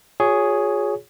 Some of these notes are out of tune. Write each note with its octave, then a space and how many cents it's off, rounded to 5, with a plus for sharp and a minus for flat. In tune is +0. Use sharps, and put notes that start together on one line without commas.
F4 +45 G#4 +0 C#5 +10